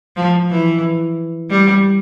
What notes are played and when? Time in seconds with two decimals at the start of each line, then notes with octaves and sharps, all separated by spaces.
0.16 F3
0.50 E3
1.50 G3